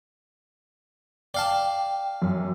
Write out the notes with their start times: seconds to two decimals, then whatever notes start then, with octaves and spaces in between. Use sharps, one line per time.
1.34 D5 F5 G5 A5
2.22 F#2